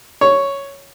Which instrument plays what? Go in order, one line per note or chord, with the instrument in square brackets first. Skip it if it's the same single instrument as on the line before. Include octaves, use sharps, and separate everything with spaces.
[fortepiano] C#5